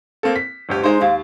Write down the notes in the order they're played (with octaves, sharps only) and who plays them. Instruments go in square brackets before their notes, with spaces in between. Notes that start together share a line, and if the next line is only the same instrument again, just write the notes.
[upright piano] A#3 C4 A4
B6
G1 D2 G4
[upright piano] G#3 C5 [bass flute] D#4
[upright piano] D#2 [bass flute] F5